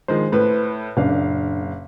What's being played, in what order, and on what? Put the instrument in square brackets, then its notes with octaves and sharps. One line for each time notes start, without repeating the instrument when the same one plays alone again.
[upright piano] D#3 F3 G#3 [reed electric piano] C5
[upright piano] A2 B4
[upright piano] F#1 F5 [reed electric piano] A#2 C#3 D4